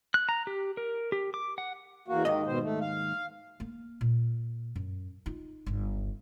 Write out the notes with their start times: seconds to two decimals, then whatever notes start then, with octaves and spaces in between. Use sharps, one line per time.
0.14 F#6
0.29 A#5
0.47 G4
0.77 A#4
1.12 G4
1.34 D6
1.58 F#5
2.08 E2 A#3 F#4
2.25 D#2 G#2 D#3 D#5
2.47 B2 C5
2.63 A3
2.81 F5
3.60 A#3
4.01 A#2
4.76 F#2
5.26 D#4 F4
5.66 G1 C#2